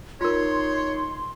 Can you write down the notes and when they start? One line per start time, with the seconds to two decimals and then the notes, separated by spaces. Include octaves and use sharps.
0.21 D#4 F4 A#4 C#5 C6